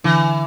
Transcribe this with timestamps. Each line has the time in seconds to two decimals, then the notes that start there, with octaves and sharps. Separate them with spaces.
0.04 D3 E3